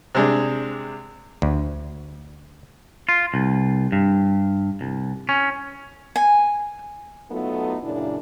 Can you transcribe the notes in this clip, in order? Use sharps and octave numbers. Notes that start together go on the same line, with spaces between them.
C3 G#3 D4
D2
F4
C2
G2
C2
C#4
G#5
F#3 A3 B3 D#4 F4 A4
F#2 A#2 C#3 D4 E4